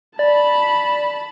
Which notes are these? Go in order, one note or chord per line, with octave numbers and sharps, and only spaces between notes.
D5 A5 B5